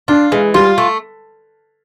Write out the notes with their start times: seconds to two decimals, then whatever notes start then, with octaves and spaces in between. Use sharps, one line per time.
0.08 D4 F4
0.32 E3 G#3
0.54 G3 F4
0.78 A3